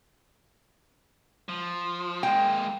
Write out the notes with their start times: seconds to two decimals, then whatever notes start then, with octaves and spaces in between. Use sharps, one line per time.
1.49 F3
2.23 G#3 A#3 G5